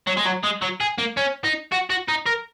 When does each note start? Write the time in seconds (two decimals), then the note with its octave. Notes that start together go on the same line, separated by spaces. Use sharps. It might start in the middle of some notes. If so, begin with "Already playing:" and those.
0.07 F#3
0.17 G#3
0.26 F#3
0.44 G#3
0.62 F#3
0.81 G#4
0.98 A#3
1.17 C#4
1.44 D#4
1.72 F#4
1.90 F#4
2.08 D#4
2.26 A#4